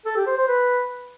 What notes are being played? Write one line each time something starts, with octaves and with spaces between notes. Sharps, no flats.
A4
G4
C5
C5
B4